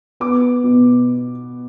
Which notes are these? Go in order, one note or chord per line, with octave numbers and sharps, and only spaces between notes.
B3 D6
B2